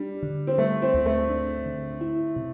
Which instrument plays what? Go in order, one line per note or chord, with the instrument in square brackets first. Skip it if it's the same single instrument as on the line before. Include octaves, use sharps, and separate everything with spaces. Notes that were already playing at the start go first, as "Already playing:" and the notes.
Already playing: [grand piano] G3 [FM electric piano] D4
[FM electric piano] D3
[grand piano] C4
[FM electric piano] G3 [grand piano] A3
[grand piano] C4
[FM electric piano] D2
[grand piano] A3
[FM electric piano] D4
D3
E4
C3